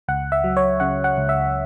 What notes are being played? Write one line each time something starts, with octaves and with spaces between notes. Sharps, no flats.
C#2 F#5
E5
F#3
C#5
C#3 F#5
F#5
C#2
E5